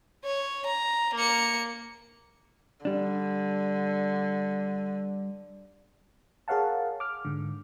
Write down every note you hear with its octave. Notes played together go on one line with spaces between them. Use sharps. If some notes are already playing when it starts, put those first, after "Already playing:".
C#5
A#5
A#3 C#7
D3 G3 D4
G#4 A#4 C#5 F5 F#5 A5
D6 F6
G#2 D3